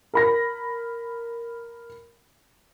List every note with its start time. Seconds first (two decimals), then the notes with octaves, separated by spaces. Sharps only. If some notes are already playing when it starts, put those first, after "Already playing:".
0.14 A#4 B5 A#6